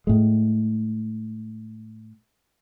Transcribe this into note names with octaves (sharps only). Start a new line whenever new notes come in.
A2 G#3